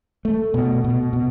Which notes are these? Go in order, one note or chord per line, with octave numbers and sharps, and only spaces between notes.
A3
B2
B2
B2